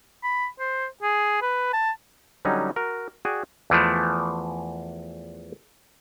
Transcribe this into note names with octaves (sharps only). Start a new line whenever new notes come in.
B5
C5
G#4
B4
A5
D3 F#3 G3 C#4 D#4
F#4 A#4
F#4 G#4 D5 G5 G#5
E2 E3 F3 A3